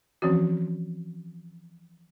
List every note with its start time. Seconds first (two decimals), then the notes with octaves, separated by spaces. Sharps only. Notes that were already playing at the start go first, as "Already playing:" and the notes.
0.22 E3 F3 C4 C#4 F#4